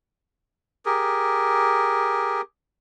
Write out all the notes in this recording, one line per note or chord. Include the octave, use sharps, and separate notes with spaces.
G4 G#4 A#4